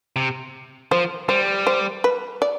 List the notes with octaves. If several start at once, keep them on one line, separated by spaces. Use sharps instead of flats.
C3
F3 C5
G3 C5
C5
B4
D5